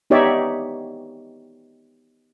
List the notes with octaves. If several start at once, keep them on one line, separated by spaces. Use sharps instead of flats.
B3 D#4 G4 C#5 D5 E5